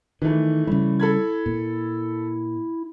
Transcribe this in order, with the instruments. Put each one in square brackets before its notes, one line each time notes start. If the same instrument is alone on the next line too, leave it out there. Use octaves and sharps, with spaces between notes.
[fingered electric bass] D#3 [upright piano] E3 A3
[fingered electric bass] C#3 G3 [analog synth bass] E4
[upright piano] A4 B5 G#6
[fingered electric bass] A#2